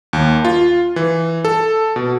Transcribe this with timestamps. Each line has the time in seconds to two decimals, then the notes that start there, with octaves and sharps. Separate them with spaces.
0.13 D#2
0.45 F4
0.96 E3
1.45 A4
1.96 B2